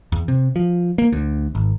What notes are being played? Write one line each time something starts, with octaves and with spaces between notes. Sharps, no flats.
E2
C3
F3
A#3
D2
G#1